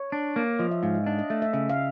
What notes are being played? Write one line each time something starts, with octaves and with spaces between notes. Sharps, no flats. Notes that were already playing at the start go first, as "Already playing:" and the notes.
Already playing: C#5
D4
A#3
F3 D#5
E5
G#2 F5
E5
D4 D#5
D#5
A3 E5
E5
C#3 E5
F5